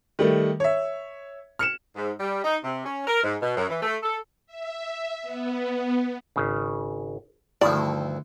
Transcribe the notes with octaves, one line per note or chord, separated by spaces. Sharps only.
D#3 G3 A3
C#5 E5
F6 C#7 E7
G#2
G3
D#4
C3
C#4
A#4
G#2
B2
F#2
E3
A3
A4
E5
B3
G#1 C#3
D2 G2 D#3 F3 E4 D5